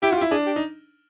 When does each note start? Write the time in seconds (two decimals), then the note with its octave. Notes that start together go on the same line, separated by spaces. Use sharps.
0.03 E4 G4
0.11 F4 F#4
0.17 G4
0.21 E4
0.31 D4 G#4
0.46 G4
0.56 D#4